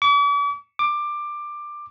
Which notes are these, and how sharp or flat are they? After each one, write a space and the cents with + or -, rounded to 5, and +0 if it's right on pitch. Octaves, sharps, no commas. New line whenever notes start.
D6 -45
D6 +15